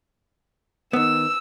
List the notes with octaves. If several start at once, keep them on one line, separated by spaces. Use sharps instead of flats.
D#3 B3 E6